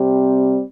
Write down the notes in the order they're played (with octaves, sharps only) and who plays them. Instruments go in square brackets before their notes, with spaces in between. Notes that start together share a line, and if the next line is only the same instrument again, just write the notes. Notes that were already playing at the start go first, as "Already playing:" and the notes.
Already playing: [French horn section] C3 G3 C4